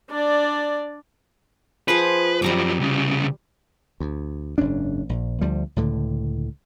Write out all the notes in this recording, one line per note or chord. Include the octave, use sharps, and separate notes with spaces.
D4 D5
F3 G#4 B4 C5
F#2 F3 G3 A#5 D6
C2 C#3
D2
F#1 G#2 C#4 D4
A#1
D2 F3 G3
C#2 A2 D3